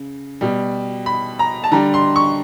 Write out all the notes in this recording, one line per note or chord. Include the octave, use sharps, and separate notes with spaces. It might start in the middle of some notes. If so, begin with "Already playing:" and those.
Already playing: C#3
B2 G3
B5
A#5
A5
D3 G3 A#5
C6
C#6